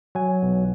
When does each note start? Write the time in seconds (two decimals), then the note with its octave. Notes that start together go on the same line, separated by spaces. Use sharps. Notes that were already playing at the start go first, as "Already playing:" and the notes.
0.15 F#3 G#5
0.43 B1